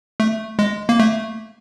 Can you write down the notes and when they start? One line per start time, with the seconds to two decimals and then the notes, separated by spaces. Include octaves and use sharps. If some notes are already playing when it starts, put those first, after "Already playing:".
0.20 A3
0.59 G#3
0.89 A#3
1.00 A3